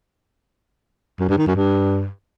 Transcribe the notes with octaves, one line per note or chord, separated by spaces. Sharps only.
F#2
G2
D#3
F#2
G2